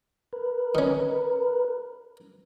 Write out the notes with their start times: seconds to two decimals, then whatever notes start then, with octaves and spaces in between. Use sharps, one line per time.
0.33 A#4 B4
0.75 D#3 C#4